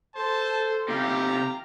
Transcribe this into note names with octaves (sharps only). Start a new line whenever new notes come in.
A4 C5 A5
C3 D#4 G4 F5 A#5